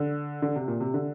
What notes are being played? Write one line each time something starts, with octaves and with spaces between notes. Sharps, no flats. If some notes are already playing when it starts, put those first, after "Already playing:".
Already playing: D3
D3
C3
A#2
C3
D3